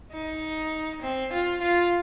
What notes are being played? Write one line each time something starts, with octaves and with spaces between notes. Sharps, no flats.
D#4
C4
F4
F4